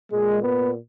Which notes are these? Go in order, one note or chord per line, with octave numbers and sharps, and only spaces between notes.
A#2 G#3
B3